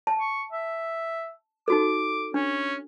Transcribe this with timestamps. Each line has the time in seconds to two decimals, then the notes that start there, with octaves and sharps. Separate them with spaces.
0.07 A5
0.20 C#6
0.52 E5
1.68 D#4 F#4 A4 D6
2.34 C#4 D4